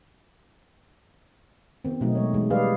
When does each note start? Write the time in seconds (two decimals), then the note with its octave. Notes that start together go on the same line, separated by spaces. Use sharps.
1.85 D#3 B3 C4
2.01 B2 F#3 A3 C4 D#4
2.15 G#3 C#5
2.33 E3 G#3
2.50 G3 G#4 B4 D5 F5